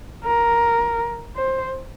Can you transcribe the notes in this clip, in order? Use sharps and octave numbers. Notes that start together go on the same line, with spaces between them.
A#4
C5